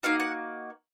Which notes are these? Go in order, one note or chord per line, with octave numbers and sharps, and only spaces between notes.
A#3 D#4 F#4 F5
F#5